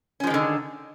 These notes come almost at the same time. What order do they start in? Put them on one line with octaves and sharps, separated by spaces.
C#4 F3 G#3 D#3 D3